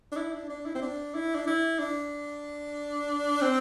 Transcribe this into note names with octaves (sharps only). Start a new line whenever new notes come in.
D4
E4
D4
D4
E4
C4
D4
E4
D4
E4
D4
C4